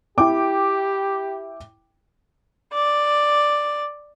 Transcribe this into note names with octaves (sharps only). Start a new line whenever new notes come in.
E4 G4 G5 D6
D5